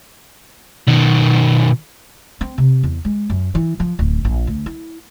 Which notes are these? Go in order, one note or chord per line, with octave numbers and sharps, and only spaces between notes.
B2 D#3
C4
C3
E2
G#3
F#2
E3
F3
D1
A#1
D2
E4